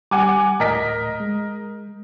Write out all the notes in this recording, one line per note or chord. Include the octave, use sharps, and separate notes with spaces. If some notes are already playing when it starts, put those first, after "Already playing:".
G3 F#5 G#5 D6
D2 A2 A#4 D#5 B6
G#3